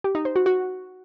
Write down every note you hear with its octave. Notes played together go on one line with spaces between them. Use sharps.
G4
D#4
C5
F#4
F#4